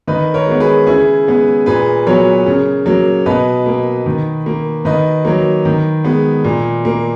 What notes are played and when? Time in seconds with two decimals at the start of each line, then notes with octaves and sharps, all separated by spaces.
0.07 D#3 B4 D#5
0.34 A#4 C#5
0.47 G#3 B3
0.60 G#4 B4
0.87 C#3 E4 G#4
1.27 G#3 B3
1.66 A#2 G#4 B4
2.06 F#3 B3 A#4 C#5
2.46 C#3
2.86 F#3 A#3
3.26 B2 B4 D#5
3.66 A#3
4.06 D#3
4.46 A#3
4.85 D#3 B4 D#5
5.25 F#3 A#3
5.65 D#3
6.04 G#3 B3
6.44 A#2
6.85 A#3